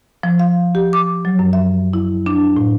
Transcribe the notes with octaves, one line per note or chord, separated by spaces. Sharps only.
F3
F5
G4
D6
F#3
F#2
E5
E4
D4
A2